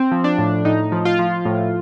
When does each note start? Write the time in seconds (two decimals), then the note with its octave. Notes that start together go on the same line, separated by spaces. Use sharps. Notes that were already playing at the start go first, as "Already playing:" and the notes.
Already playing: C4
0.12 F3
0.24 D4
0.38 A2
0.65 A2 D#4
0.92 F3
1.05 F4
1.19 F3
1.45 A2